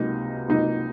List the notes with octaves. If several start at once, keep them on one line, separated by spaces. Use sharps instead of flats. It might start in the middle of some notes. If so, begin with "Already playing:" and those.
Already playing: C#2 C3 F#3 A#3 D#4
C#2 C3 F#3 A#3 D#4